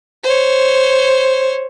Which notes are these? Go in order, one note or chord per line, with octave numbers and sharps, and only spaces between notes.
C5 C#5